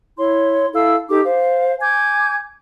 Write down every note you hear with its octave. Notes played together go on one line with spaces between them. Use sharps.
E4 C#5 C6
E4 A4 F5 E6
D#4 G4 A4 D6
C5 F5
G#5 D6 G6 G#6